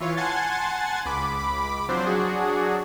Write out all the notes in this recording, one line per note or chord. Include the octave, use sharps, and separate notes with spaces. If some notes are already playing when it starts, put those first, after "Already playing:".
E3 F4 C#5 F5
F#5 G#5 A5 C6 G#6 A6
C#2 B5 D6
F3 F#3 C4 D4 C5
F#3 D4 F#4 G#4